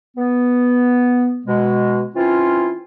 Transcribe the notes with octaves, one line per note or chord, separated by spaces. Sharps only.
B3
B2 G#3
E3 C4 C#4 E4 F4